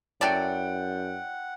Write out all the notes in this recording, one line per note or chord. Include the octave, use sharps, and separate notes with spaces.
F#2 F#3 E4 A4 D5 F#5 G5